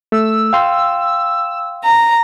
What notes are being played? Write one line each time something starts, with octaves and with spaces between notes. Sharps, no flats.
A3 E6
F5 G5 C6
A#5